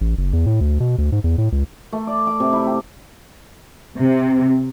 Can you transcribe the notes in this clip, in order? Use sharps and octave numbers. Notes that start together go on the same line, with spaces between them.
A1
F#1
E2
A2
D2
B2
D2
G#2
E2
A2
C#2
A3
D5
D6
C3
E4
G4
C3